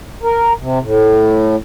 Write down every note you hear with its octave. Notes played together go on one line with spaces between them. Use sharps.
A#4
C3
A2